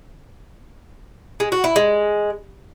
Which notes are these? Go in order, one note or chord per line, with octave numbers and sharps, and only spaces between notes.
G#3
F#4
E4
G#3